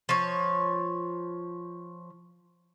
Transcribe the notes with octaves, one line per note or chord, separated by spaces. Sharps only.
F3 C#5